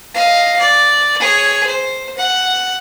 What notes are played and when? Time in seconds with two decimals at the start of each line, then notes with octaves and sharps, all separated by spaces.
0.15 D#5 F5
0.59 D5
1.20 G#4 C#5
1.66 C5
2.17 F#5